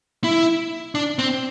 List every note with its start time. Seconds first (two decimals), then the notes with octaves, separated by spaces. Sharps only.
0.24 E4
0.95 D4
1.19 C4